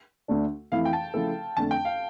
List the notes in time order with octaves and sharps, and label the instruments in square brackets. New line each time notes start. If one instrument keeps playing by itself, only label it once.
[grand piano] D2 D3 A3 D4
[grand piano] F2 E3 A3 E4 [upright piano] F5
[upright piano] G5
A5
[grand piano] C#3 F3 A3 E4 A4
[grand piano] F2 D3 A3 [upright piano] A5
[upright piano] G5
F5